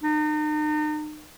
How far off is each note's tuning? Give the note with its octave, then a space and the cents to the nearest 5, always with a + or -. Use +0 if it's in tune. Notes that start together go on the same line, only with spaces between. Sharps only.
D#4 -40